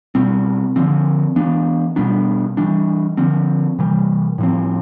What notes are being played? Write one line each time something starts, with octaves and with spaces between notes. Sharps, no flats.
B2 G3 C4
D3 F3 C4
E3 B3 D4
B2 G3 B3 D4
E3 G3 D4
D3 F3 C4
C3 E3 G3
A2 F3 C4